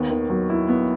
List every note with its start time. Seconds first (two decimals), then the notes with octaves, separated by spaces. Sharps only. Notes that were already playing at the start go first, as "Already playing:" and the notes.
Already playing: D#2 B3
0.10 D#3
0.30 F#3
0.50 E4
0.69 B3